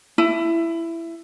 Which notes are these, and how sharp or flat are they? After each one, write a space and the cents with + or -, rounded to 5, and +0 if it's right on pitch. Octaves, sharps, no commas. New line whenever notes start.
E4 +15